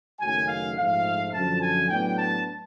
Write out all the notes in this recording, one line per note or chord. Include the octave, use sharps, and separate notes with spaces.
F#1 F#2 D#3 F#3 A3 G#5
F5
A#1 G#2 F3 A3 F5
F#2 D3 F3 A5
G#5
A2 F#3 B3 D4 G5
A5